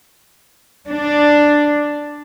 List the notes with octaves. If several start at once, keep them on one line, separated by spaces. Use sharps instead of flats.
D4